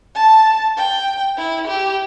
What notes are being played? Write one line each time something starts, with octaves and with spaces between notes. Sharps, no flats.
A5
G5
E4
G4